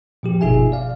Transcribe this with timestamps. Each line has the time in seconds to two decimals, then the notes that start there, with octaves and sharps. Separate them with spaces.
0.23 A#2 F3 G4
0.41 G1 B2 D#4 G#4 E5 G#5
0.72 D5 F5